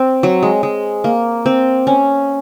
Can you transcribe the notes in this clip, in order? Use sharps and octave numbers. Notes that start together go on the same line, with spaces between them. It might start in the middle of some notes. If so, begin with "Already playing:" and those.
Already playing: C4
F#3
G#3
G#3
A#3
C4
C#4